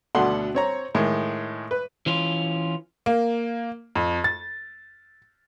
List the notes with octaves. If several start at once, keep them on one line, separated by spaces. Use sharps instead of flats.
D2 B2 D4 A4 F#5 C6
C4 C#5 A#5
A2 D#3 G#3
B4
E3 C#4 F4
A#3
F2
A6